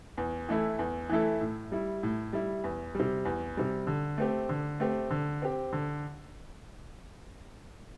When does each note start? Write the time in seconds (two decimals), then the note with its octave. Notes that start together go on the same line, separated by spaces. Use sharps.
0.17 E2
0.49 E3 A3 E4 A4
0.79 E2
1.09 E3 A3 E4 A4
1.41 A2
1.72 G3 E4
2.03 A2
2.33 G3 E4
2.64 E2
2.95 C3 G3
3.25 E2
3.57 C3 G3
3.87 D3
4.18 A3 C4 G4
4.49 D3
4.80 A3 C4 G4
5.10 D3
5.42 C4 G4
5.73 D3